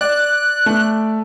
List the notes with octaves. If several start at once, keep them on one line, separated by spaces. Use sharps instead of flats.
D5 F#6
A3